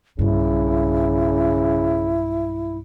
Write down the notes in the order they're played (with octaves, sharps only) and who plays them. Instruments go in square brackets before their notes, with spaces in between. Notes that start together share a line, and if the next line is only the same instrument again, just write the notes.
[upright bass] B1 G2 [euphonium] C#3 [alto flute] E4